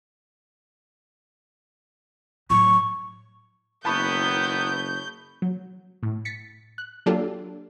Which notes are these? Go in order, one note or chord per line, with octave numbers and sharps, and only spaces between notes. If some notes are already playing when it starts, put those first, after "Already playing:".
A2 F#3 C#6
F#1 D#3 B3 E4 A5 B5 C#6 G6
F#3
A2
A6 B6 C#7
F#6
F#3 A#3 D4 F4 G4 A4